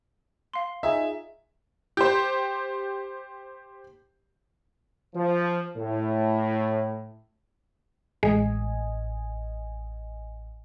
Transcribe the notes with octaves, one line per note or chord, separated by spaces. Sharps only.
F5 C6
D#4 F4 G#4 E5
G4 C5
F3
A2
A1 G#3 D#5 G#5